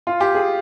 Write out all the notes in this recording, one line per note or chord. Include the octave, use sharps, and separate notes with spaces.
F4
G4
G#4